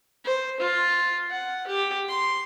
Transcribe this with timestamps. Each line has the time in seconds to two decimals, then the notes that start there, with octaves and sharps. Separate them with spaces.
0.24 C5
0.60 F4
1.30 F#5
1.67 G4
2.09 C6